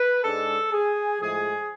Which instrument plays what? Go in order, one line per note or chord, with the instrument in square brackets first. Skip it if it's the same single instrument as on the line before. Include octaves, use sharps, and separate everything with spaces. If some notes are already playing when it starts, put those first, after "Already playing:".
Already playing: [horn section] B4
G#2 G#3 D4 A4
G#4
A2 F3 G#3 G#4